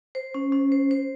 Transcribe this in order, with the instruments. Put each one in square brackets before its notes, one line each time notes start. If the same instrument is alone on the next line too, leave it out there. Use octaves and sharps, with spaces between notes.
[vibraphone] C5
C#4
C#4
C5
C5